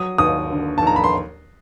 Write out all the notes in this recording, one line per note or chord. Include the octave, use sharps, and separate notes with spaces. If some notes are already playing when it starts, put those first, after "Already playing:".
Already playing: F#3 D#6
D#2 D#6
D3
A5
D#2 A#5
B5
C6